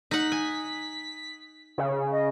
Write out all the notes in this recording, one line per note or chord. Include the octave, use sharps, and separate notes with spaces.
D#4 F#5 B6
G#5
C#3
D#5